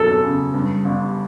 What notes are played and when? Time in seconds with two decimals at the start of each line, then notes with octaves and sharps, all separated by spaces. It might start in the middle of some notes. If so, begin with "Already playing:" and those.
Already playing: E1 E2 F#3 A4
0.24 C#3
0.54 G2
0.84 G1